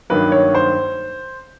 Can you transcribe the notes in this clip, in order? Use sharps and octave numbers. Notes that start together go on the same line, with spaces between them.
G2 D#3 F#3 A#3 B4
C#5
C5